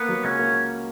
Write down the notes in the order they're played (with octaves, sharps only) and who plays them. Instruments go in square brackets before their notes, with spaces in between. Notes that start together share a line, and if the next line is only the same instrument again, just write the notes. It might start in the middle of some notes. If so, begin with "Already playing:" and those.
Already playing: [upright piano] A#3 [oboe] B3
[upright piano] F#3
[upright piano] C#2 [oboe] C#4
[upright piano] A#3